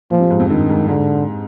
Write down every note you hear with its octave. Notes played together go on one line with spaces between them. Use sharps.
A#2 F3
C3
G#2
F2
G2 D#3
G#2
G#2 D3